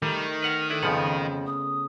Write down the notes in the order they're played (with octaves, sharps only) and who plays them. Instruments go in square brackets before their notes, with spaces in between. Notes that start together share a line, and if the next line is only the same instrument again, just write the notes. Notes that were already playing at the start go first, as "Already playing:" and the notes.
[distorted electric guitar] D#3 [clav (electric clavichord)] G3 [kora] A3 [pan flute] A#5
[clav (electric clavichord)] B4 F#5 A#5 [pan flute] F6
[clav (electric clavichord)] D4 E4 B4 [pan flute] A4
[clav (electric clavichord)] F2 F3 F#5 [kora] C#3 A3 B3
[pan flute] D#6